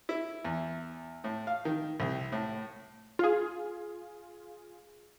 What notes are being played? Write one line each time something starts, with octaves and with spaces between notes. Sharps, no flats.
E4
E2
A2
F5
D#3
C2
A2
F4 G#4